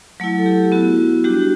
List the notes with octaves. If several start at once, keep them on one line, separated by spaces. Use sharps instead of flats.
F#3 A3 E4 F#5
A4
G4
B3 E4 F#4
G3 D4 F#4 G4